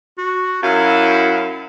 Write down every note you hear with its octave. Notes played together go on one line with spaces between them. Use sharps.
F#4
F#2 E4 F5